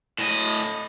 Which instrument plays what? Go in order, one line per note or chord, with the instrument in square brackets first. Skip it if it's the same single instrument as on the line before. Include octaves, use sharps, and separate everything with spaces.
[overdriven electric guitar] A2 D#5